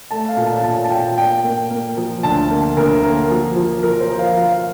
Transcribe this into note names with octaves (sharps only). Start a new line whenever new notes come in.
A3 A5
F5
A#2
A5
A#2 A5
A5
A#2 G5
A#3 G5
A#3
A#3
F3
D2 A5
A#3
D2 A#4
A#3
F3
F3
F3 A#4
C5
F3
F5
F3 F5
F5